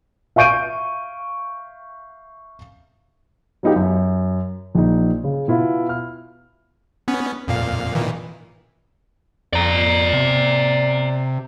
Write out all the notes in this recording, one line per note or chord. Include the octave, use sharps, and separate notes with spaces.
E5 F5 C#6 G6 D7 D#7
F#3 B3 D#4 F4 G4
F#2
A#1 D#4
C#3
B2 E4 F4
F6
B3 C#4
F2 A#2 F5
A#2 D#3 E3
F2 D5 A#5
C3